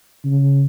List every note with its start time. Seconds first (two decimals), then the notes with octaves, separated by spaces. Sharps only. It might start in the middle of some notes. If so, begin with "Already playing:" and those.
0.25 C#3